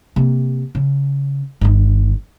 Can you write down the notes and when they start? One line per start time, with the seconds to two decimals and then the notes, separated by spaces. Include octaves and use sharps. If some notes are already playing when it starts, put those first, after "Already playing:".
0.16 C3 A#3
0.75 C#3
1.61 G1 D#3